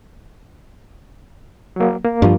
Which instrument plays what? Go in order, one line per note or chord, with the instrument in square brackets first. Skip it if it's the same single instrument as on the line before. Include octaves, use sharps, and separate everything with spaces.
[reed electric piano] F#3 A#3
A#3
[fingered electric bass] G2 F3